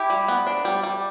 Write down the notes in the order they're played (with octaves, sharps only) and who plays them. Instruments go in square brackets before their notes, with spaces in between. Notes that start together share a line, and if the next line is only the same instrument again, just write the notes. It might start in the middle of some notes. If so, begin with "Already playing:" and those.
Already playing: [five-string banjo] E4 G4
G3
B3
D4
G3
G3